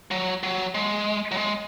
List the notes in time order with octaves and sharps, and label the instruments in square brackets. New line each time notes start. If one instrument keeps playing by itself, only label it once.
[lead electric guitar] F#3
F#3
G#3
F#3
G#3